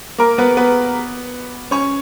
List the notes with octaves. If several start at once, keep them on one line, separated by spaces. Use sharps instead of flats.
A#3 A#4
B3 B4
B3 B4
C#4 C#5